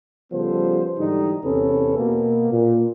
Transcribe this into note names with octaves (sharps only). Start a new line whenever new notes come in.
C#3 F3 G3 B3 A4 C5
G#2 D3 E3 G3 D#4
E2 C3 C#4 A4 B4
B2 A#3 B3
A#2